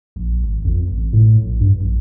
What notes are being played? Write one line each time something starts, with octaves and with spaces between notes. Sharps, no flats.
A#1
G#1
F2
A1
A2
A#1
G2
A#1